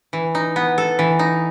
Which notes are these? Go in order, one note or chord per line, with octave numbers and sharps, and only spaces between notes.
E3
D#4
B3
A4
E3
D#4